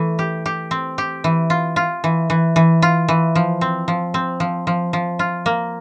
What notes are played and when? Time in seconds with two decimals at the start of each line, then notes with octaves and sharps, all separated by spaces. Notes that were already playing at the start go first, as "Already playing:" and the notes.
Already playing: E3 A3
0.19 G4
0.46 G4
0.71 C4
0.98 G4
1.24 E3
1.50 F4
1.76 F4
2.04 E3
2.30 E3
2.56 E3
2.82 F4
3.08 E3
3.35 F3
3.61 C4
3.88 F3
4.14 C4
4.40 F3
4.67 F3
4.93 F3
5.19 F4
5.46 A#3